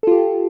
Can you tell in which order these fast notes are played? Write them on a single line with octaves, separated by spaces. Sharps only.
A4 F4 G4